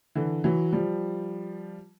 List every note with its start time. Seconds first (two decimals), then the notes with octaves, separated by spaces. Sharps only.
0.15 D3 E3
0.44 E3 F#3
0.73 F3 G3